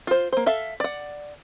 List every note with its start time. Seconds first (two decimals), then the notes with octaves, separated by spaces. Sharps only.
0.07 F4 C5
0.33 A#3 C5
0.46 A4 E5 F5
0.80 D5 F#5